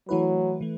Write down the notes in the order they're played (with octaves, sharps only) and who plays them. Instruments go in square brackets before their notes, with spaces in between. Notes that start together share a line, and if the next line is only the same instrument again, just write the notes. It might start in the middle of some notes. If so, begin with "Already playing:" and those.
[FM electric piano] E3 A3 E4 B4 [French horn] F#3
[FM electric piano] E3 A3